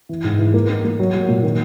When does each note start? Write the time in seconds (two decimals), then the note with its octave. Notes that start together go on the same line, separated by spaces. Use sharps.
0.09 E3
0.24 G#2
0.39 E3
0.54 A#3
0.69 D#4
0.85 A#3
1.00 F#3
1.15 F#3
1.29 A#2
1.43 D#3